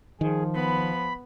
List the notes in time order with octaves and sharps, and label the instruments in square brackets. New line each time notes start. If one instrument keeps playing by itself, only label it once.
[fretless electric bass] D#3 [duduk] F3 [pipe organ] G#4
[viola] B3 [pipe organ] B5